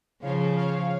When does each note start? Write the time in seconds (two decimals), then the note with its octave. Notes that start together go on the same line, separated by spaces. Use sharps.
0.22 C#3 F3 C#5 F5
0.56 C#5 F5